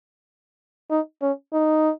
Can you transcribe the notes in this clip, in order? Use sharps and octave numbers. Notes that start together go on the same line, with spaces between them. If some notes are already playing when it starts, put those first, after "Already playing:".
D#4
C#4
D#4